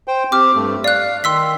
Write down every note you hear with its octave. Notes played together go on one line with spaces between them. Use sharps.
C5 G5
C4 G4 D6 F6
G2 A3
D5 F5 F#6
D#3 C6 E6 B6